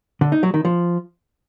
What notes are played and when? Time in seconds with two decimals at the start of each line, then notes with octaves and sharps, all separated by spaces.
0.21 D3
0.32 D#4
0.43 F#3
0.54 D#3
0.65 F3